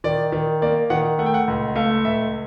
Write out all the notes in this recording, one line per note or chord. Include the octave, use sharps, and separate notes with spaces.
D#3 D5
D#3
A#3 D5
D#3 F#5
A3 F#5
G5
F#5
C#2
A3 F5
C#2 E5